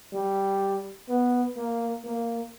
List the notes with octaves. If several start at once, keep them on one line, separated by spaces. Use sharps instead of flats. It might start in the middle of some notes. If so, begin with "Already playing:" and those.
G3
B3
A#3
A#3